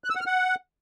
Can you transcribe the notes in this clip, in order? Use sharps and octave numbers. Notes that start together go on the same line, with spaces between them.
F#6
E6
F#5
F6
F#5